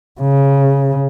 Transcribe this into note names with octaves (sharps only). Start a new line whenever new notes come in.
C#3